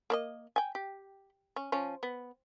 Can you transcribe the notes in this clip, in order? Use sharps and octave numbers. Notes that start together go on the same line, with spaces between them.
A#3 D5 D#5
G5 G#5
G4
C#4
F3 C#4
B3